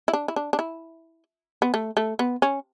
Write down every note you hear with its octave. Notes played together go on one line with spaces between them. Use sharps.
E4
D4
E4
D4
D4
E4
B3
A3
A3
B3
C#4